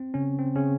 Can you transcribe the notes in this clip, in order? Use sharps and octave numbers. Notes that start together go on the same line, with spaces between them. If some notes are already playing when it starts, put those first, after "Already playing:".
Already playing: C4
C#3 C#4
C4
C#3 C#4